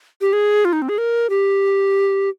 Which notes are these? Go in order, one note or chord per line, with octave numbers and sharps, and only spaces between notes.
G4
G#4
F4
D#4
C4
G#4
A#4
G4